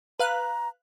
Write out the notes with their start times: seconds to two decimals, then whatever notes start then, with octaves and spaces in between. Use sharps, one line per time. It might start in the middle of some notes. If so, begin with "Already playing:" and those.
0.19 B4 F5 A#5 F#6